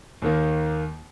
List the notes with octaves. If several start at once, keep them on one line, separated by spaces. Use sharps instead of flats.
D#2 D#3 A#3